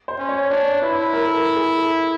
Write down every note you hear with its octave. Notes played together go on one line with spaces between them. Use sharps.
C5
C#4
C#5
D4 C#5
E4 B4
A#4
A4
A#4
G#4
A4